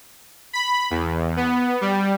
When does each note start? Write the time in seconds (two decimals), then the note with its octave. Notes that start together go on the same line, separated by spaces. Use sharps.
0.53 B5
0.91 E2
1.37 B3
1.81 G3